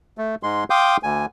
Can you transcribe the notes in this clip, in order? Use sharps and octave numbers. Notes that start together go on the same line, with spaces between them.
A3
G#2 G#3 C6
F5 G5 C6 D6 D#6 G6
D2 G#5